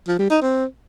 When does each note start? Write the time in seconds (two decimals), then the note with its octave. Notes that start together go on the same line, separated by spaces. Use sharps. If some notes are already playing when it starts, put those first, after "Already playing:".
0.08 F3
0.19 G3
0.30 D#4
0.41 C4